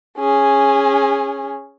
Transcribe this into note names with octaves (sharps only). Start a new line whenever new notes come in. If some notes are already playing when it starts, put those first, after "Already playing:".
C#4 G#4